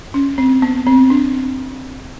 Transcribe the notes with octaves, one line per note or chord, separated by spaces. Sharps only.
C#4
C4
B3
C4
D4